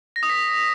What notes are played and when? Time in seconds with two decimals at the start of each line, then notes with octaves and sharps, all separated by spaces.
0.16 A#6
0.23 D#6
0.29 B6